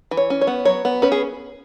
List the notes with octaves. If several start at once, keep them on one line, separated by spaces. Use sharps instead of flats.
E3
C#5
C#4
C#5
B3
F#3 C#5
B3
C#4 B4
G#4